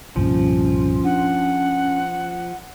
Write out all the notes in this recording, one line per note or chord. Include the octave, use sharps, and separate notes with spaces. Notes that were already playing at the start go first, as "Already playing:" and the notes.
C2 G2 A#2 F3 C#4
D4 F#5